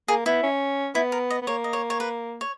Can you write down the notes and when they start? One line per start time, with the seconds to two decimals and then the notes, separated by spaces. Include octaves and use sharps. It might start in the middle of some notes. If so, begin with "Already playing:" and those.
0.08 A#3 G#4
0.26 B3 E4
0.43 C#4
0.95 B3 E4
1.12 A#4
1.30 D#5
1.42 B3
1.47 A#3 C#5
1.64 D#5
1.73 C#5
1.90 C#5
2.00 B4
2.41 C#5